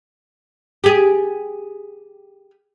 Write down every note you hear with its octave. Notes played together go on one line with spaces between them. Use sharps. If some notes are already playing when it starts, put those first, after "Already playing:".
G4 G#4